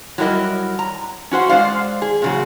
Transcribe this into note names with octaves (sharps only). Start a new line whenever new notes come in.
F#3 G3 E4 A#4 D#5
A#5
C#4 F#4 C5 F#5
G#3 C5 D5 F5
G#4
A#2 C#3 F#3